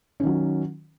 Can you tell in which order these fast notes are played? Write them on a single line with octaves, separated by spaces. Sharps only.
C#4 D#3 F#3